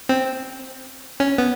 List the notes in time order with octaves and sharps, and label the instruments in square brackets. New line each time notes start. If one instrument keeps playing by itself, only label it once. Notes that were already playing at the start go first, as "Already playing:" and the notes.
[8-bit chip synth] C4
C#4
B3